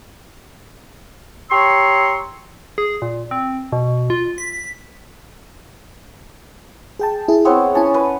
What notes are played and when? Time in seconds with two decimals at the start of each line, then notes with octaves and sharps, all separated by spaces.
1.51 G4 C#5 A#5 C6 C#6 E6
2.78 G#4
3.02 A#2
3.31 C4
3.72 B2
4.10 F4
4.38 B6
6.99 G#4 G5 A5
7.28 E4 G#4
7.45 B3 C4 C#5
7.75 C#4 E4 G#5 A5
7.94 B4